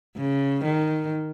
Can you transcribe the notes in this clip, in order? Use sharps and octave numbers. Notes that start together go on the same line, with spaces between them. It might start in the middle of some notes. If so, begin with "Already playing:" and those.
C#3
D#3